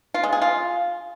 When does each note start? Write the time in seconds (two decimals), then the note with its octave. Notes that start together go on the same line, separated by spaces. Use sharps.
0.14 F4
0.23 G#3
0.33 G#4
0.42 F4